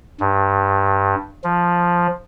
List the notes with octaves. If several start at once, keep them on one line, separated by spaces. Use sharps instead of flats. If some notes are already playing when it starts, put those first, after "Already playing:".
G2
F3